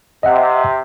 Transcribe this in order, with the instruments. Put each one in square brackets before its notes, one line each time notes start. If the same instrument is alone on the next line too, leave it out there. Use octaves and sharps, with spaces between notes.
[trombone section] C3 [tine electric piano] D#5 E5 F#5